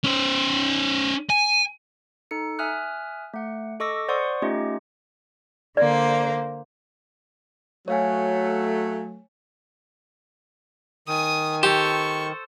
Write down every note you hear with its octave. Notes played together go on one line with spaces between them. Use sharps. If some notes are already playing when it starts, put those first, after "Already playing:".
C#4 C5
G#5
D#4 A4 C#7
E5 G#5 D#6 F6 F#6
A3 F#5
A4 D#5 C#6 D6 E6 A#6
C5 D5 F#5 C6 C#6 D#6
A3 C#4 D#4 F4 G4 D#5
D3 A#3 C5 D5
F#3 A3 C#5 F5 G#5
D#3 G#5 D#6
G4 A4 C5 C#6